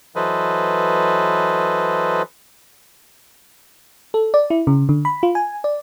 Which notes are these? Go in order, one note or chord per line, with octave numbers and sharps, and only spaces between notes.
E3 F#3 A4 B4 C5 D#5
A4
D5
E4
C#3
D3
B5
F4
G#5
D5